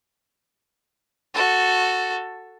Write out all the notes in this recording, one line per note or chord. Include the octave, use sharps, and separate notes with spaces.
F#4 A4